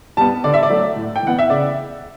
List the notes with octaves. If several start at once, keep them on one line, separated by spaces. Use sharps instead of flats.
G3 B3 A5
D3 D5
E5
D5
F#3 A3
A2
G5
E3 B3 F#5
E5
C#3 D5